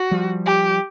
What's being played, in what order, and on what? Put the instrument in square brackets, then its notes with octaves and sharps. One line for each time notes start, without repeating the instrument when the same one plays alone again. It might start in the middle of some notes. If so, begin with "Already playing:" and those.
Already playing: [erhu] F#4
[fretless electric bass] F3 G3
[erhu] G4